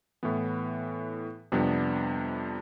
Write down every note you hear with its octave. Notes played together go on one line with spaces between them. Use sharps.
A2 E3 B3
F2 C3 G3 B3 D4